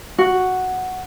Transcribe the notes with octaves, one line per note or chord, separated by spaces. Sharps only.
F#4